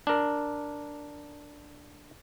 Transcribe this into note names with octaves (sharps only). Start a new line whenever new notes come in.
D4 A#4